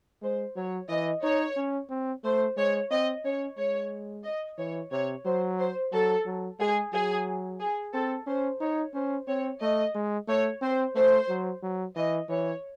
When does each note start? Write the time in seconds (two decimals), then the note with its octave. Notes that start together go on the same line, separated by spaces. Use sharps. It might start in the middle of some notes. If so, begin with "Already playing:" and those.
0.22 G#3 C5
0.56 F#3 C#5
0.89 E3 D#5
1.23 D#4 C#5
1.57 C#4
1.89 C4
2.24 A3 C5
2.57 G#3 C#5
2.91 C4 D#5
3.24 C#4 C#5
3.58 G#3 C#5
4.24 D#5
4.58 E3 C#5
4.91 C3 C#5
5.25 F#3 C5
5.59 C5
5.92 F#3 A4
6.26 F#3
6.59 G#3 G#4
6.93 F#3 G#4
7.60 G#4
7.93 C4 A4
8.27 C#4 C5
8.60 D#4 C#5
8.93 C#4 C5
9.27 C4 C#5
9.61 A3 D#5
9.95 G#3
10.28 A3 C#5
10.62 C4 C5
10.95 A3 C5
11.29 F#3
11.63 F#3
11.96 E3 D#5
12.29 E3 C#5